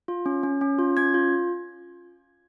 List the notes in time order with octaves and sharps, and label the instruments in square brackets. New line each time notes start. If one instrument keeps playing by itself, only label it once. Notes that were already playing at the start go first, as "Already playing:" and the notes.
[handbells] F4
C#4
C#4
C#4
F4
C#4 G#6
F4